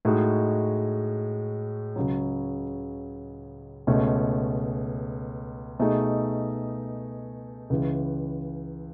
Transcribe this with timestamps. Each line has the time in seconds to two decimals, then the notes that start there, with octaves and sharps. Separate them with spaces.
0.05 A2 G#3 D#4 F#4
1.96 C#2 C#3 F#3
3.87 C#2 B2 A3 C#4
5.79 B2 A3 D#4 G#4
7.70 C#2 C#3 E3